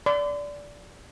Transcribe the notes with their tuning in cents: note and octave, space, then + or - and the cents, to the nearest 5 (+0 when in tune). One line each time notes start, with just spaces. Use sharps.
D5 -15 C6 -45